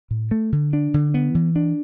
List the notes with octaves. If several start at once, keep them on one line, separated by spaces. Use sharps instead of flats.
A2
A3
D3
D4
D3
B3
E3
D4